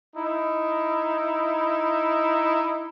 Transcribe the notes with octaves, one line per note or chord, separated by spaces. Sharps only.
D#4 E4